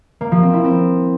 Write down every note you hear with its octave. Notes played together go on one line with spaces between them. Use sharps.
A#3
F3
C4
E4
C4